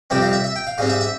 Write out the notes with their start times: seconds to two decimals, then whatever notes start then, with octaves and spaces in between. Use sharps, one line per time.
0.10 F2 C3 G3 C4 G5
0.22 F5
0.33 E5
0.44 E5
0.56 G5
0.67 F5
0.78 G#2 G3 C4 F5
0.89 E5
1.01 E5